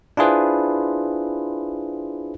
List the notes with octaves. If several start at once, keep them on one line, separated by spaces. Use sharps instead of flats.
D4 E4 F4 G#4 B4 C5